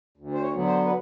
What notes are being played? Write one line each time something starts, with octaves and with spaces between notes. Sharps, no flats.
D2
C5
C#5
D3 F#3 B3
C5
B4